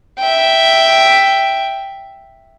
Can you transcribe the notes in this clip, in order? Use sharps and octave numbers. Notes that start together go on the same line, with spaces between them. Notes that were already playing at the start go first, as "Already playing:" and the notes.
E5 G5